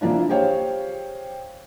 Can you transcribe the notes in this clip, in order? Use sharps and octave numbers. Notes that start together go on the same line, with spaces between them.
E3 F3 A#3 D4 F4
G4 G#4 C5 C#5 F5 G5